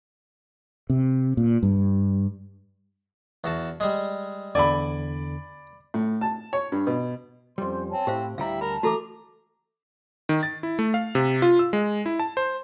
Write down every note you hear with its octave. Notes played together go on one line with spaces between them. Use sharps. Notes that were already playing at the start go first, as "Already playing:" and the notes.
C3
A#2
G2
E2 F#4 A5
G3 G#3
E2 D3 D5 G#5 B5
A2
A5
C#5
G2
B2
F2 G3 C#4 C5 C6
C4 C#5 G#5 A5
A2 E4 G4 C5 F5
D2 G3 E4 F5 G5 A#5
A#4 A5 B5
E3 A3 F#4 A4 A#5 D6
D#3
A6
E4
A3
F5
C3
F4
E6
G#3
E4
A5
C5